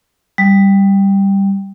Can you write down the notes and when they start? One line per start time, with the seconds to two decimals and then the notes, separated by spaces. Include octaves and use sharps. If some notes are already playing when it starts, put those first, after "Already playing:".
0.38 G3